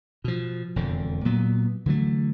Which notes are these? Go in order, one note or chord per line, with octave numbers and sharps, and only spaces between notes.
B2 F3
E1 F2 D3
A#2 F#3 B3
D3 E3 F#3 A3